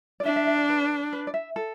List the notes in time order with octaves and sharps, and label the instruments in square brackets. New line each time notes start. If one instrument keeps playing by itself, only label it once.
[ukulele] D5
[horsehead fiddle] D4 [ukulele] E5
[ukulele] E5
E5
D5
B4
B4
D5
E5
A4